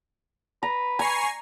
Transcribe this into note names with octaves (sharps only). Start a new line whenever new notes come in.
B4 A#5
G#5 A#5 C#6 C7